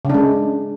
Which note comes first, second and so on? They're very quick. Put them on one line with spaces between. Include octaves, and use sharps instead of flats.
C#3 D4 G#3